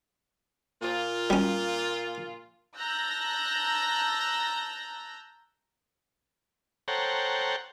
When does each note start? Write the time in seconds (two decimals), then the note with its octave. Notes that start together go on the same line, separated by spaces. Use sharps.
0.83 A#2 A#3 F4
1.30 G3 C#4
2.77 A5 A#5 E6 F#6 G6 A#6
6.88 A4 C5 C#5 F#5 G5 A#5